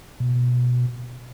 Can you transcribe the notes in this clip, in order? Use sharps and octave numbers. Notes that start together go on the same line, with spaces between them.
B2